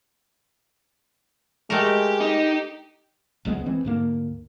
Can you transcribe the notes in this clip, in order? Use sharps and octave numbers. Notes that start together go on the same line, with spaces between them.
G#3 A3 G4 A#4
D#4
F#1 C#2 G#3 B3
E3 C4
D2 G#2 A#3